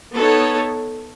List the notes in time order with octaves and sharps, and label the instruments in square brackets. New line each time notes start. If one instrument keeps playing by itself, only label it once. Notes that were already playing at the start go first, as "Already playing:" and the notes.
[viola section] B3 D#4 A4 C#5